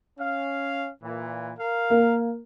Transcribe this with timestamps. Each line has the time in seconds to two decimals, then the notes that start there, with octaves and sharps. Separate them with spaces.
0.17 C#4 F5
1.03 A#2 E3
1.58 A#4 F5
1.90 A#3